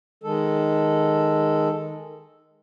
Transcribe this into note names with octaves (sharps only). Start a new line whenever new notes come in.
D#3 G#3 A4